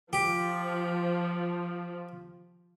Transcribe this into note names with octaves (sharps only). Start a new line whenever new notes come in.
F3 G4